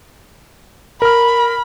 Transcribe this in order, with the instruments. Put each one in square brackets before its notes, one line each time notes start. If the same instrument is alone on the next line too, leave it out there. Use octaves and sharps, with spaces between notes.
[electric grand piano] A#4 F6 [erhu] B5